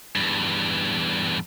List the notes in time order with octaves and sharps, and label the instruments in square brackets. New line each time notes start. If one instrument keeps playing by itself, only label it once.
[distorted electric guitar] E2 G2